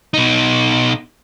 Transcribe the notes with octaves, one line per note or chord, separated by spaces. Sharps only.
B2 D#4